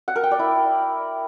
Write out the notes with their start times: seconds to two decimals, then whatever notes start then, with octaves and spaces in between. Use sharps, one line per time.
0.08 F#5
0.16 A#4
0.23 G5
0.31 D5
0.39 E4